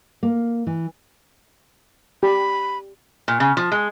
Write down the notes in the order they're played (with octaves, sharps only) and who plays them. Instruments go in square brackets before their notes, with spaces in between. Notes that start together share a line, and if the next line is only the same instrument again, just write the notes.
[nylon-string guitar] A#3
E3
[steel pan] G4 [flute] B5
[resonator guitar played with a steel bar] A#2
C#3
F3
G#3